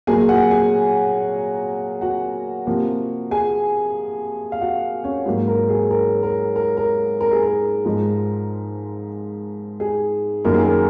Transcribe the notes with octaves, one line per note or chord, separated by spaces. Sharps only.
A#2 F#3 A#3 G#4 G#5
F#4 F#5
G#4 G#5
F#4 F#5
C3 F3 A#3
G#4 G#5
F5
F#4 F#5
C#4 C#5
G#2 F#3 A#3
A#4
G#4
A#4
A#4
A#4
A#4
A#4
G#4
A#4
G#2 F3 G#3
G#4
F#2 D#3 A#3 A#4
G#4
A#4